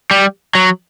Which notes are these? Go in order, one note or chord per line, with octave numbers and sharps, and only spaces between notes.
G3
F#3